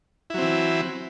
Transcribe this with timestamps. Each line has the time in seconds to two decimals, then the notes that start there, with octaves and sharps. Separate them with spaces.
0.30 E4
0.34 F#3
0.38 C4
0.42 E3